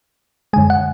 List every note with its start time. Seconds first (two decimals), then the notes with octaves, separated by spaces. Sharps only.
0.53 F#2 D3 G#3 G#5
0.70 F#5